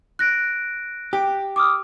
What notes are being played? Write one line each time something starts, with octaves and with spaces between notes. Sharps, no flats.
F#6 A#6 D7
G4
D6 D#6 F6